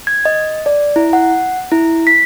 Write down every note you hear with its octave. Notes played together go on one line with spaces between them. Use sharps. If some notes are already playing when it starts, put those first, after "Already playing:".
G#6
D#5
D5
E4
F#5
E4
B6